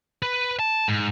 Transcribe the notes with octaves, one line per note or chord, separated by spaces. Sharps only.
B4
A5
G#2